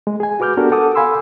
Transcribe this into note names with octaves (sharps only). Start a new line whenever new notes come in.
G#3
G#4 G#5
F#4 B4 D6 F6 G6
B3 D4 F#4 G4 A4 A#4
A4 F#5 D6 D#6
F5 G#5 B5 C6 E6